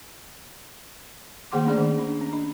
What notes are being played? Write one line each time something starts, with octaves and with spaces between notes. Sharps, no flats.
D#3 A#3 G#4 F#5 C6 D6
A3 C#4 D4 G#4 D5
D#3
C#4 D4
C#4
D4